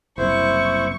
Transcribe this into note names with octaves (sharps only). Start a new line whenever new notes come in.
F#1 C2 E4 C5 C#6